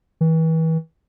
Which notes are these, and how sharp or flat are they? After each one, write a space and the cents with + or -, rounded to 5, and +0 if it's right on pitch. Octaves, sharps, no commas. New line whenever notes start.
E3 -35